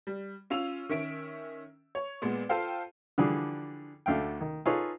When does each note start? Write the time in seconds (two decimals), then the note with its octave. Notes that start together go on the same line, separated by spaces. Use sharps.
0.07 G3
0.50 C#4 F4 E6 F7
0.89 D#3 C#4 E5 D7
1.95 C#5
2.22 A#2 G#3 B3
2.49 F4 A4 C5 F5 G5
3.18 D3 E3 F3 G3 D4 G#4
4.06 D2 D3 A3 F5 G5
4.41 D#3
4.65 D#4 F4 G#4 A4 B4 C#5